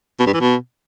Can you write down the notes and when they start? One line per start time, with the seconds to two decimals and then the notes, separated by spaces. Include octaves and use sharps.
0.19 B2
0.27 G2
0.34 E3
0.41 B2